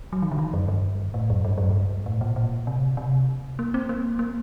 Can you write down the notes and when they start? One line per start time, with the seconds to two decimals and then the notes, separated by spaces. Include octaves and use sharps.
0.13 F#3
0.22 D#3
0.31 D3
0.38 D#3
0.53 F#2
0.68 G2
1.14 A2
1.30 F#2
1.45 G2
1.58 F#2
1.70 G2
2.06 A2
2.21 A#2
2.36 A#2
2.67 C3
2.97 C3
3.59 A#3
3.74 C4
3.89 A#3
4.19 A#3